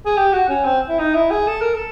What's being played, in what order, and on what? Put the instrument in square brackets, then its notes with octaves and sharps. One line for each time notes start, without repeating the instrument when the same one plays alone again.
[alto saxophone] G#4
G4
F#4
C#4
C4
E4
D#4
E4
G#4
A4
A#4
A4